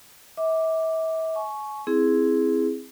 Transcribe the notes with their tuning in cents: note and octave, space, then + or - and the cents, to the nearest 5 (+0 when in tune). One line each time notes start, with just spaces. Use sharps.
E5 -40 D6 +0
G#5 +35 C#6 +0
C4 +0 E4 +0 G#4 +0